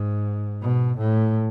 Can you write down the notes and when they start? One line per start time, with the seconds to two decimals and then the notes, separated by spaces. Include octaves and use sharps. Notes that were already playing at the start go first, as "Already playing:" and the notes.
Already playing: G#2
0.63 B2
0.98 A2